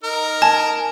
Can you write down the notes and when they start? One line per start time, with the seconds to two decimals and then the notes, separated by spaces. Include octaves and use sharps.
0.04 D#4 A#4
0.42 G#5 A5